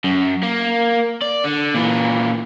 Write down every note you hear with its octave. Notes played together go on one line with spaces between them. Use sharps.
F#2
A#3
D5
D3
A#2 E3